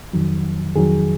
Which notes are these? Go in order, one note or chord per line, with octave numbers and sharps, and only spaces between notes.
F2 D#3 F#3
F2 D#3 F#3 G#4